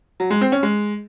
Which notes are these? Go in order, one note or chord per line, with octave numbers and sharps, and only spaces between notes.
F#3
G#3
C4
C#4
G#3